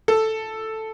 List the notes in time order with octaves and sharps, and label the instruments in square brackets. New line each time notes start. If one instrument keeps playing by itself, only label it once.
[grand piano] A4